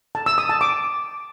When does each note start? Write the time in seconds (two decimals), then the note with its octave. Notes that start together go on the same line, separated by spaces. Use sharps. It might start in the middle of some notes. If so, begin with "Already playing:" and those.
0.15 A5
0.26 E6
0.38 D#6
0.49 A5
0.61 D6